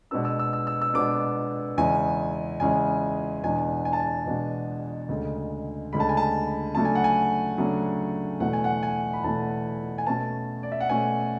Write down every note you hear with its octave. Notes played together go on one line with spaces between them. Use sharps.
B2 G#3 B3 D4 E6
E6
E6
E6
E6
E6
B2 G#3 B3 D4 D6
E2 C#3 G#3 C#4 E4 G#5
E2 C#3 G#3 C#4 E4 G#5
E2 B2 G#3 D4 G#5
G#5
A5
G#5
E2 B2 G#3 D4
D2 C#3 G#3
D2 C#3 G#3 B5
A5
G#5
A5
C#3 F#3 A3 D4 A5
G#5
F#5
G#5
C#3 F#3 A3 D4
E2 B2 A3 E4 F#5
G#5
F#5
G#5
B5
E2 B2 A3 E4 A5
G#5
B2 A3 C#4 A5
D5
E5
F#5
B2 A3 C#4 G#5